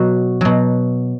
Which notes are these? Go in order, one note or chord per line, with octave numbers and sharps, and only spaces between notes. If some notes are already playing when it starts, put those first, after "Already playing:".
Already playing: B2 F#3 F#4
B2 F#3